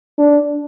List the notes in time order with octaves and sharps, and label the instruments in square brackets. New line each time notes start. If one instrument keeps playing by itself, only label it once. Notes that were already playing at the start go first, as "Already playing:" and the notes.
[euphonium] D4